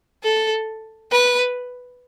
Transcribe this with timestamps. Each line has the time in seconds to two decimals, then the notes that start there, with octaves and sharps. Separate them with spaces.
0.24 A4
1.12 B4